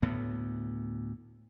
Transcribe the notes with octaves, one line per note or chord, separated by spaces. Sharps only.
D2 A2 B3